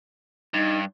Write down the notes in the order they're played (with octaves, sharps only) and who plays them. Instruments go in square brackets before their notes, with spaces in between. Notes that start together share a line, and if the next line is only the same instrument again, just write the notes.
[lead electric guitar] G2 [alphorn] D#4